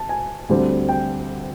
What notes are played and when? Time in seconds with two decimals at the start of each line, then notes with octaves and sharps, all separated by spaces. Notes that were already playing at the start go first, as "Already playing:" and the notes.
Already playing: A5
0.09 G#5
0.49 D2 D3 G3 C4
0.89 G5